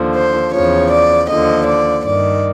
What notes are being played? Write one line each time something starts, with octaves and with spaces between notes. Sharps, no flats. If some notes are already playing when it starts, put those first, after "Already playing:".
Already playing: D#2 D3 F3
C5
E2 C#3 F3 C#5
D5
D#2 D3 F3 D#5
D5
G2 D#3 D5